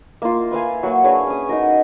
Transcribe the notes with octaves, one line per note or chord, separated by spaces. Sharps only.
A#3 F4
B4 E5 F5 G#5
F#3 A#3
D4 G#4 B4 C#5
C#4 D#6
D#4 F#4 A#4